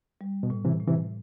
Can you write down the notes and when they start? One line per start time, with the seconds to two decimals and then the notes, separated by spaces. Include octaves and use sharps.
0.21 G3
0.43 B2
0.50 A2
0.65 C3 E3
0.80 A2
0.87 C3 E3